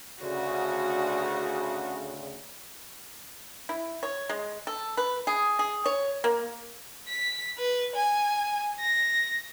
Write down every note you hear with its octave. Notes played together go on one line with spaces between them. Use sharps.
D2 C#3 F#4
E4
C#5
G#3
A4
B4
G#4
G#4
C#5
A#3
B6
B4
G#5
A#6